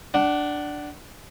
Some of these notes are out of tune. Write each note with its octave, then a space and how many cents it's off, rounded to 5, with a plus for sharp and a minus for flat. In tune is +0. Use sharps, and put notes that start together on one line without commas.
D4 +0 F#5 +30